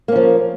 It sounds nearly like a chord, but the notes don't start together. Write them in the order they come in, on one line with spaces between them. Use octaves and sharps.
A#3 C#4 F3